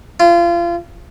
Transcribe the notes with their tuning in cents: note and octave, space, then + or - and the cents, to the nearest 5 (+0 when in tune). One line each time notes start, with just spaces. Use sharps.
F4 -30